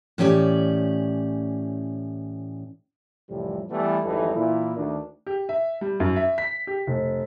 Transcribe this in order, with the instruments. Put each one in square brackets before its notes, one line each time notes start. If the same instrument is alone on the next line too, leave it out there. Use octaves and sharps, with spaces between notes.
[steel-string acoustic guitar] A2 E3 C#4 G4 D5
[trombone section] C2 F2 A2 C3 E3 G3
E3 G3 A3 B3 E4
G#1 F2 E3 G3 D#4 A4
A#2 E3 E4
D2 D#3 D4
[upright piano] G4
E5
G3
F#2
E5
B6
G4
F1